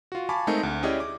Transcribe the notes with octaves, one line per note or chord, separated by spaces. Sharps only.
F4 F#4
F5 G#5 A5 B5 C#6 D6
G#3 A3 C4 D#4 A#4
D2
C#4 E4 G4 G#4 D5 D#5
D6